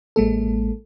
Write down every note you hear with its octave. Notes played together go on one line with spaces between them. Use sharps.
A1 G#3 A#3 A4